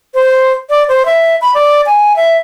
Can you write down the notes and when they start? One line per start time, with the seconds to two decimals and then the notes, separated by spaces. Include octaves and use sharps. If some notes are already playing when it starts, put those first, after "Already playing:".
0.14 C5
0.70 D5
0.89 C5
1.06 E5
1.41 B5
1.55 D5
1.86 G#5
2.16 E5